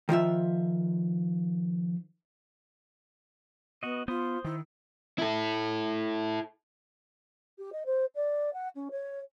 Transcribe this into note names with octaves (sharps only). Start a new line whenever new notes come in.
D#3 F3 F4 E5
B3 F#4 D#5
B3 F4 C5 D#6
D#3 E4
E4 A4
G4
D#5
C5
D5
F#5
C#4
C#5